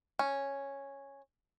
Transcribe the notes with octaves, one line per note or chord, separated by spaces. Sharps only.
C#4